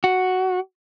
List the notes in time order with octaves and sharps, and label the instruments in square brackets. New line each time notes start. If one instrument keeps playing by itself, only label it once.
[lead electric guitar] F#4